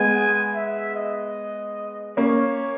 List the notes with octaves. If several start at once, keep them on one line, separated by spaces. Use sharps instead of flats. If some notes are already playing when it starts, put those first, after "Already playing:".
Already playing: G#3 B3 G#5
E5
D#5
A#3 C#4 C#5